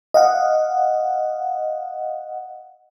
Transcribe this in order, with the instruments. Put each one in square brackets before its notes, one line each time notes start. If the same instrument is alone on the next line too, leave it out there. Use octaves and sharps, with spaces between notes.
[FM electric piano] D#5 F5 F#5